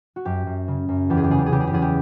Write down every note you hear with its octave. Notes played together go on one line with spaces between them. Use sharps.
F#4
F#2 G4
F#2
C#3
F#2
E2 G4
G#4
G4
C#3 G#4
G4
G#4
C#3 G4
G#4
G4
E2 G#4
G4